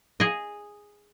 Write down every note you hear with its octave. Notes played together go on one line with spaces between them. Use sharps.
G#4 D#5